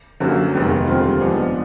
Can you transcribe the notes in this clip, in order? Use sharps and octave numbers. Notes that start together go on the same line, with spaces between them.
G1 F#2 D3 F#3 A#3
F1 D#2 D#3 G#3 B3
D#2 D3 G3 C4 F4
G#2 F3 G#3 B3 D4